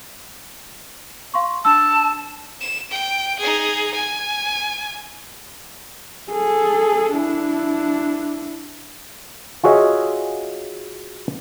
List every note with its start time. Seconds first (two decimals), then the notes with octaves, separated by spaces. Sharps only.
1.34 F5 C6 C#6
1.65 D4 A5 E6
2.61 E7
2.91 G5
3.39 D#4 G#4
3.94 G#5
6.31 G#4 A4
7.14 D4 E4
9.64 F4 F#4 G#4 C#5 D#5 E5